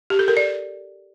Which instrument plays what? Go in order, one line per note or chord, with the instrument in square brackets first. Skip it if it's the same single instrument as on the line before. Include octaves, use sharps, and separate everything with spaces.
[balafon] G4
A4
A#4
D5